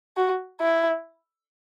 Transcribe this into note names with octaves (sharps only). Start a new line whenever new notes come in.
F#4
E4